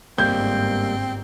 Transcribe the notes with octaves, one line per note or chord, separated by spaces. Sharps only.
G1 G#2 G3 A#3 C4 G6